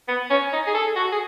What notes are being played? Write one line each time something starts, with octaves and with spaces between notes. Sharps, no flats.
B3
C#4
D#4
G#4
A4
F#4
G#4